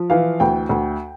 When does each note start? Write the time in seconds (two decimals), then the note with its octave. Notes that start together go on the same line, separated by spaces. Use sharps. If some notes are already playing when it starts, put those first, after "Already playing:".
Already playing: F3
0.10 E3 F5
0.40 D2 G5
0.69 D2